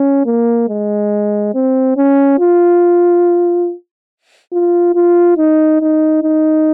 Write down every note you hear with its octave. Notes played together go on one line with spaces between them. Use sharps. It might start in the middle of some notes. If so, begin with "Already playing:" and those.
Already playing: C#4
A#3
G#3
C4
C#4
F4
F4
F4
D#4
D#4
D#4